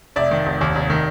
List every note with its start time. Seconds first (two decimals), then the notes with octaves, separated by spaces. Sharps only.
0.16 F1 D5 E5
0.31 D#3
0.46 F1
0.61 D#2
0.75 F1
0.90 D#3